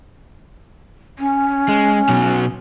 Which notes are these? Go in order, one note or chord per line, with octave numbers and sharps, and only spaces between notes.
C#4
G#3
B2 F#3